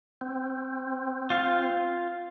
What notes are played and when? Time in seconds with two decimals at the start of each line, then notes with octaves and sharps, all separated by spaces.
0.21 C4
1.30 F4 F5